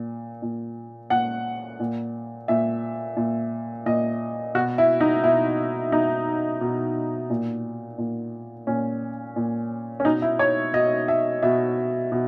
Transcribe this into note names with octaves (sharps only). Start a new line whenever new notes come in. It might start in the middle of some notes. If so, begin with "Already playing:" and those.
Already playing: A#2
A#2
A#2 F#5
A#2
A#2 E5
A#2
A#2 D#5
B2 F#4
E4
D#4
B2 E4
B2 D#4
B2
A#2
A#2
A#2 C#4
A#2
C#4
B2 D#4
E4
C#5
B2 D#5
E5
B2 E5
B2